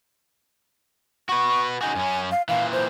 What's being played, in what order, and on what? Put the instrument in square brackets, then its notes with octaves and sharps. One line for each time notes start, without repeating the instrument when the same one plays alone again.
[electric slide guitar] F#4 B4 [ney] C#6
[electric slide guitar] C#3 D#4 F#4 [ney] G#5
[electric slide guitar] F#2 C#4
[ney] F5
[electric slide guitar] A#2 E3 [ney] F5
[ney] C5